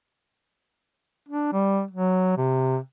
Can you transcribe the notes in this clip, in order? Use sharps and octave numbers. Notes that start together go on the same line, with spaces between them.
D4
G3
F#3
C3